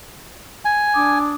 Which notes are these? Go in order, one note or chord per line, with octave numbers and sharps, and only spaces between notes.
G#5
D4 D6 D#6